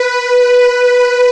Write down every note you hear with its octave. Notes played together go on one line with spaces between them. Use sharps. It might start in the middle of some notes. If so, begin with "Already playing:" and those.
Already playing: B4
B4